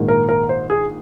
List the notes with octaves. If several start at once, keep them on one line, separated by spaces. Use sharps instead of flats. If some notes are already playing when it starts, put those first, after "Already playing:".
Already playing: A#1 G#2 D#3
A#4
A#4
C5
G#4